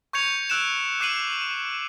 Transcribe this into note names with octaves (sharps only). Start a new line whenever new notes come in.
C#6 G6 G#6 C#7 F7
E6 F#6 D7 E7
D6 F#6 C7 D#7 F#7